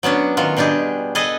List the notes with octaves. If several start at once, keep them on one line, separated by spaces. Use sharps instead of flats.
F#3 B3 C#4 D4
D#3 F#3 F4
B2 G3 D4 G4 G#4
G#4 A4 B4 D#5 G#5